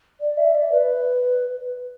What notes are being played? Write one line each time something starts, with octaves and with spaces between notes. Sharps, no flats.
D5
E5
D5
B4